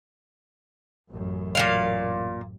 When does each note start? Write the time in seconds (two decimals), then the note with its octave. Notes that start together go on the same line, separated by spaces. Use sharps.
1.11 A1 F#2
1.55 A#2 F#3 F5